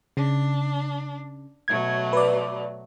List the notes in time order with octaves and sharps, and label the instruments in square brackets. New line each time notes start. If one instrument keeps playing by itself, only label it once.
[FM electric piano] C#3 [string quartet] D4
[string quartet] B2 F#3 A3 [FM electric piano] G#6
[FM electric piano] B4 D5